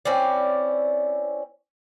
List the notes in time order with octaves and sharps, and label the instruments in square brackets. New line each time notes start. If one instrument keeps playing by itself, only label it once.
[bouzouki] C4 C#4 E4 D5